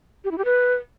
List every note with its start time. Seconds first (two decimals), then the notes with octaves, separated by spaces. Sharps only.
0.24 G4
0.31 E4
0.38 G4
0.45 B4